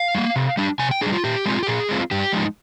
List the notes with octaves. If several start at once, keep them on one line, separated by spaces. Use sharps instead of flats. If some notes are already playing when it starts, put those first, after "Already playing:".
Already playing: F5
G3 A#3
C3
G3 D4
C3 G#5
G5
G3 D4 G#4
F4
A#2 G4
G#3 C4 F4
G4
A#2 G#4
G#3 C4 F4
G2 G4
F3 G#3 D#4